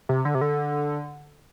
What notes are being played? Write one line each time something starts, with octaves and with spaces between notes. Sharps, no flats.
C3
D3
C3
D3